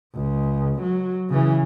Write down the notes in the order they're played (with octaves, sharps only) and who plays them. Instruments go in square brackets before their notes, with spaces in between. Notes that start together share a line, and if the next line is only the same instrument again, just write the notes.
[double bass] C#2
F#3
C#3 E3